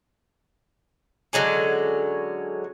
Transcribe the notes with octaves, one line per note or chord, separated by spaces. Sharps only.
D3 F#3 G#3 C#4